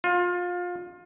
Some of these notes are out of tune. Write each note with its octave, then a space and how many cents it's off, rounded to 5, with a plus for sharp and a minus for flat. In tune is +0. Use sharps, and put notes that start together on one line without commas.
F4 +25